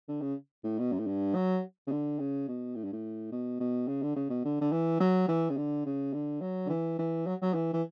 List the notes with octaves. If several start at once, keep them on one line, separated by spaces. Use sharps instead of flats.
D3
C#3
A2
B2
F#2
A2
G2
F#3
C#3
D3
C#3
B2
A2
G2
A2
B2
B2
C#3
D3
C#3
B2
D3
D3
E3
F#3
E3
C#3
D3
C#3
D3
F#3
D3
E3
E3
F#3
F#3
E3
E3